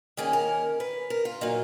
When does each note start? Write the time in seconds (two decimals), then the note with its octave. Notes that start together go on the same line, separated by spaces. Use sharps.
0.17 D#3 A#3 C#4 G#4
0.33 A#4
0.80 B4
1.10 A#4
1.25 F4
1.41 A#2 F#3 A#3 D#4